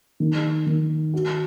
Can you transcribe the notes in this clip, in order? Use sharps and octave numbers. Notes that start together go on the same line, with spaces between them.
D#3
D#3
F#4